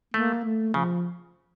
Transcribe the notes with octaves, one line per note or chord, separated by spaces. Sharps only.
A3 A#3
A3
C#3 F3